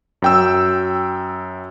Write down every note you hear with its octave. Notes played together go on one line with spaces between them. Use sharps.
F#2 G5 E6